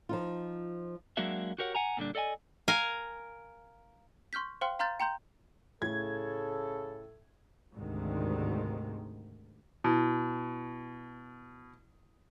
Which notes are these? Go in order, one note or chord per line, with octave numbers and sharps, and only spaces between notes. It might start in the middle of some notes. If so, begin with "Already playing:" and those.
F3 D#4 F4
F#3 G#3 A#3 D4 F#4 E5
F#4 G4 A#4 C#5 F#5
F#5 G#5 A#5
A#2 D3 G3 D4
A4 D5 D#5 G5 G#5
A#4 F5 G#5
C6 C#6 F6 G6 B6
C5 F5 G5 C6 F6
F5 A#5 C6 F6 G6 A6
G5 A#5 C6 G6
A2 C#3 A4 G#6
D2 G#2 C3 D#3
B2 E4